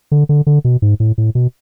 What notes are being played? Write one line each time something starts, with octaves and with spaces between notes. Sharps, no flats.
D3
D3
D3
B2
G#2
A2
A2
B2